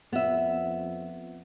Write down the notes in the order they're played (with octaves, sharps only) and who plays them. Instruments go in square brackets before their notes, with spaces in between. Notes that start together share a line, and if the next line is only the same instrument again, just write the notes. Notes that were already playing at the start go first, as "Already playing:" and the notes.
[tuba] F2 [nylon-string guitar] B3 E5